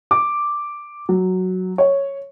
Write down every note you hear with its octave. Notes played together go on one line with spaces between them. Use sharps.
D6
F#3
C#5